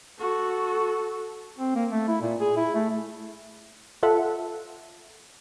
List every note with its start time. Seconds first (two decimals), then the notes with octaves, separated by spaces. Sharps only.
0.18 F#4 A4
1.59 C4
1.75 A#3
1.91 A3
2.08 E4
2.22 A#2
2.41 G#4
2.57 E4
2.75 A3
4.03 F4 A4 E5 F#5